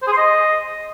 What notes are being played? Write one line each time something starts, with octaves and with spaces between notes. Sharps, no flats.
C5
G#4
C6
D#5